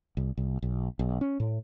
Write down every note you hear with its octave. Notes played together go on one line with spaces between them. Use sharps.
C2
C2
B1
B1
C#4
A2